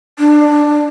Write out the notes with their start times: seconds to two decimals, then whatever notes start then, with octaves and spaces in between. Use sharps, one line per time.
0.19 D4